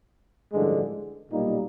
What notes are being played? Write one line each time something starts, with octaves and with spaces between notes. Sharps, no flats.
A1 G2 D3 F3 G#3
B1 A#2 G3 A#3 D#4